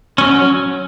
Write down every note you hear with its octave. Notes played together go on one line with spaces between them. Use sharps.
F#3 C#4